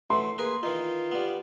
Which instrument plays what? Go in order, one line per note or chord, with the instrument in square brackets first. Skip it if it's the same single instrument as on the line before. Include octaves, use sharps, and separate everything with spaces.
[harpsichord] E3 F#3 [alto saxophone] A3 [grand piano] C6
[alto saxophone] A#3 [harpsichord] G#4 A#4 B4
[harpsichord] D#3 E3 D#4 [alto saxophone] F4
[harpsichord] G3 B3